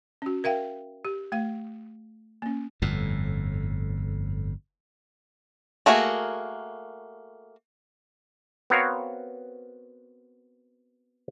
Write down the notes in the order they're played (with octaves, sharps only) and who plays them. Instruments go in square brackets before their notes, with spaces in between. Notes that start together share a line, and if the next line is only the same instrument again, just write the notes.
[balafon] C#4 F#4
A#4 E5 F5 G5
G4
A3 F5
A#3 C#4
[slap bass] G1 F2 A2
[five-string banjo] A3 A#3 F#4 G#4 A#4
[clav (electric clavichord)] B3 C4 F#4 A#4 C#5 F5